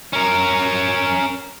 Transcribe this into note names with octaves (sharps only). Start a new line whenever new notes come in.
C#4 A#4